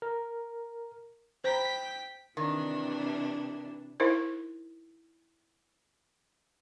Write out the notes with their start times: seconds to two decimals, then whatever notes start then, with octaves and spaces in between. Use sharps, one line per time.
0.02 A#4
1.44 C5 G5 A#5 B5 B6
2.37 C3 D#3 E3 D4
4.00 D#4 E4 A#4 C5